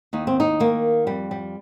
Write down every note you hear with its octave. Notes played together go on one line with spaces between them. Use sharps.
D#2 D#4
C4
D#4
D#3 A#3
F2 G3
G3